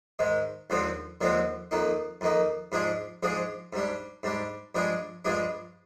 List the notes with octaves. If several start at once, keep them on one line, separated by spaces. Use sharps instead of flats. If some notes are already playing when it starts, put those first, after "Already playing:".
G#2 D#3 G#3
D#2 D3 F3 G#3 C4
D#2 D3 F3 G#3 C4
F2 D#3 A#3 D#4
F2 D#3 A#3 D#4
G#2 F3 G#3 D4 G#4
G#2 F3 G#3 D4 G#4
G#2 G3 D4
G#2 G3 D4
G2 F3 G#3 D4 G#4
G2 F3 G#3 D4 G#4